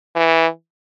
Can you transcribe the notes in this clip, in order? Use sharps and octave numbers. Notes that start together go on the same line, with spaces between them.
E3